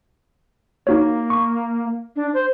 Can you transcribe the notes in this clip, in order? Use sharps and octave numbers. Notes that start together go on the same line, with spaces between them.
A#3 D#4 F#4 C#5
C#6
D4
C5